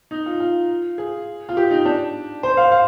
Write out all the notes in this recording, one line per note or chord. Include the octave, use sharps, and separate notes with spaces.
D#4
F4
F4
G#4
F4
G4
D#4
D4
C5
F5
F5